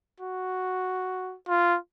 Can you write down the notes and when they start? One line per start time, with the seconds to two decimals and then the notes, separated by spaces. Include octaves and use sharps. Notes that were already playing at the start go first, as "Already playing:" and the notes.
0.20 F#4
1.48 F4